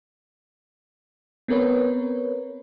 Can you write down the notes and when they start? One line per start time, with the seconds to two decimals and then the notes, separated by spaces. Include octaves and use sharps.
1.48 B3 C4 A#4 B4 C#5